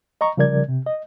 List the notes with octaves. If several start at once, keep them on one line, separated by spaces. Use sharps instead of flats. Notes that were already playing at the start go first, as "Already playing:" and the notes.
D#5 A#5 C#6
C#3 F3 G3 A#4 D5 G#6
C3
D#5